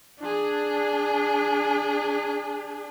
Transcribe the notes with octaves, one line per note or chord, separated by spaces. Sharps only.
D4 G#4